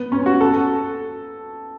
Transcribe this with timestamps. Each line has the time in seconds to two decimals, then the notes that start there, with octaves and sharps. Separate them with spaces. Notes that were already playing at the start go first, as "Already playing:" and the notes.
Already playing: B3
0.12 C#4
0.26 F#4
0.41 A4